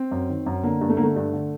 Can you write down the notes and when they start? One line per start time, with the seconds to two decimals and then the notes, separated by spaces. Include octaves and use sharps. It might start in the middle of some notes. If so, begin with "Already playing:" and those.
Already playing: C4
0.11 F#2
0.29 D#3
0.46 F#2
0.63 D3 A#3
0.81 G2
0.90 A3
0.97 D3 A#3
1.04 A3
1.16 G2
1.33 D3